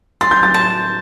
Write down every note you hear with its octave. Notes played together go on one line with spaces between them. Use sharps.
C6 A6
G6
A6
A5